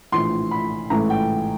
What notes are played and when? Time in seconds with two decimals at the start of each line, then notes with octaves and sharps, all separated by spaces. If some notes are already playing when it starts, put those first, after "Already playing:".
0.12 A#1 A2 E3 C6
0.51 B5
0.90 A1 G#2 E3 A3 A#5
1.10 G5